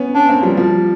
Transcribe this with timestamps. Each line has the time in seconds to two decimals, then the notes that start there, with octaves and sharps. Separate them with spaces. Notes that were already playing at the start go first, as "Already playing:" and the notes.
Already playing: B3 C#4
0.14 B3 C#4 D4
0.29 A#3 C4
0.43 F3 G3
0.57 F3 G3